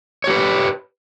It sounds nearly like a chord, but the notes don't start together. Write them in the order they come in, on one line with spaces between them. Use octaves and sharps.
C#5 G4 B4